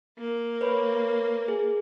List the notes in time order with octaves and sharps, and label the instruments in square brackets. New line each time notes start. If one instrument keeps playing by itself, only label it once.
[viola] A#3
[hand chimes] B4 C#5 B5
G#4